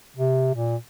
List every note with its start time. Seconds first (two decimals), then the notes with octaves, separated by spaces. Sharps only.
0.17 C3
0.55 A#2